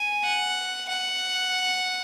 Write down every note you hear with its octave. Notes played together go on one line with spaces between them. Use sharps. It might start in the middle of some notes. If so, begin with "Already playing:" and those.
Already playing: G#5
F#5
F#5